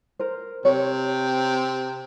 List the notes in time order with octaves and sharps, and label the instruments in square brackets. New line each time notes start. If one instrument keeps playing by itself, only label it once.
[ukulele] A#4 C5
[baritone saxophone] C3 [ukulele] C#5